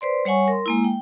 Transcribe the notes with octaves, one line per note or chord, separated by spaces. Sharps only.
B4 C5 D5 C6
G3 C#5 F#5 G#5 C#6
A#4 C6
G#3 A#3 E4
G5